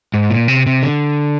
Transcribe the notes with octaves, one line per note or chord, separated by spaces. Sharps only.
G#2
A#2
C3
C3
D3